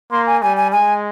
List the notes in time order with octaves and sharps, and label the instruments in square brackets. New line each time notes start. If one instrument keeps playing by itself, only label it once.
[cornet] A#3 [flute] C6
[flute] G#5
[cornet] G3 [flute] G#5
[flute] G#5
[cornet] G#3 [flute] G#5